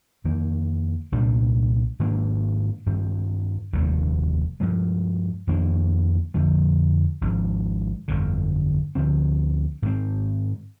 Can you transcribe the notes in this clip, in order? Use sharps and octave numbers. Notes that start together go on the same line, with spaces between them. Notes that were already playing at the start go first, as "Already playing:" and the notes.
F2 D#3 A#3
C2 A#2 G3 D4
G#2 D#3 A#3 D4
G2 D#3 G3 C4
F1 D#2 D#3 G3
G2 F3 G#3
F2 D#3 A#3 D4
F2 D3 F3
G#1 G#2 F3 G#3
G1 F2 D3
D2 D3 F3 C4
G#2 D#3 G3 C4